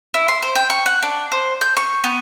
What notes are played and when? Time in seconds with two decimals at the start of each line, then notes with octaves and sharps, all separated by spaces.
0.14 E4
0.28 C6
0.42 C5
0.55 G5
0.70 C#6
0.86 F#5
1.03 D4
1.32 C5
1.61 G6
1.77 C#6
2.04 B3